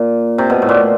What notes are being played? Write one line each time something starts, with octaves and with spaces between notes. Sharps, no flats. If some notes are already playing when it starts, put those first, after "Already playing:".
Already playing: A#2
C3
B2
A2
A#2